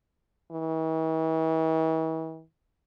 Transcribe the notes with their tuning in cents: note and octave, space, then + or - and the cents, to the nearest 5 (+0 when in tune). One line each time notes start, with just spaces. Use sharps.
E3 -45